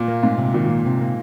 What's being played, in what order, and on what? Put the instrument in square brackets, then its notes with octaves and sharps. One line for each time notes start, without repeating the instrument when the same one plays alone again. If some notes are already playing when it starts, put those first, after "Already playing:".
Already playing: [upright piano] A#2
[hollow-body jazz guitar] A#3
[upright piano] G#2 [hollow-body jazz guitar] F4
[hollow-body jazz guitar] C3
[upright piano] A#2 [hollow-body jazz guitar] D#3
[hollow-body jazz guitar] A#3
C3
A#3